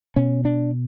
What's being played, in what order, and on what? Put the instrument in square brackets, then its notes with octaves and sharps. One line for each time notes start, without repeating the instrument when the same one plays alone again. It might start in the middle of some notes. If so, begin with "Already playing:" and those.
[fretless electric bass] B2 C#4
D4